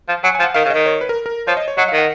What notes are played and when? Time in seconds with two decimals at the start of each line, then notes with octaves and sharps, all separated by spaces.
0.09 F3
0.24 F#3 G#5
0.35 G#5
0.40 F3
0.44 F#5
0.54 D#3 F5
0.65 C#3
0.70 D#3 D#5
0.86 C#5
1.01 B4
1.09 A#4
1.26 A#4
1.47 F3 C#5
1.57 D#5
1.68 C#5
1.77 F#3 D#5
1.88 F5
1.93 D#3
1.98 F#5